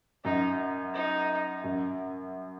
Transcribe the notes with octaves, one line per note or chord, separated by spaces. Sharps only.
F#2 D#4
D#4
F#2